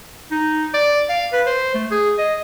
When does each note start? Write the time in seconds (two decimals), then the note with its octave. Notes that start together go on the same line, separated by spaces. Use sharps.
0.31 D#4
0.74 D5
1.09 F5
1.33 B4
1.46 C5
1.75 A3
1.91 G#4
2.18 D#5